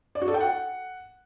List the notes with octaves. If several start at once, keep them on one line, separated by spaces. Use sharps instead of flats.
D5
F#4
A4
G5
F#5